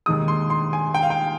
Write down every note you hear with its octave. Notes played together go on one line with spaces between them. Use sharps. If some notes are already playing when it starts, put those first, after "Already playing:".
D#2 D#3 G#3 D#6
C6
C6
G#5
G5
F5
G5